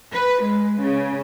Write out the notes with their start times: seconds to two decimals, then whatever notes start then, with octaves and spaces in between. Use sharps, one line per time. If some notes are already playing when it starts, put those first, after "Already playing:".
0.13 B4
0.43 G#3
0.81 C#3